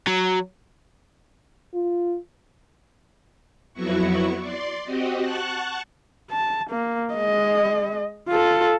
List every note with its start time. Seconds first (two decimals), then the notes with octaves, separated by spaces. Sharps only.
0.07 F#3
1.74 F4
3.74 F2 F#3 B3 E4 F#4 C#6
4.40 D5 C6
4.84 C4 F#4 G4 D#5
5.20 F#5 A5 C#6 F#6
6.31 A5
6.71 A#3
7.13 G#3 D#5
8.29 F4 A4